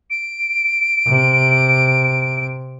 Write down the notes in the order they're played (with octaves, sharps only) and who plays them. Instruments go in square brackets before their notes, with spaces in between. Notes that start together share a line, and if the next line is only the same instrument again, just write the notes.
[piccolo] D7
[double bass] C3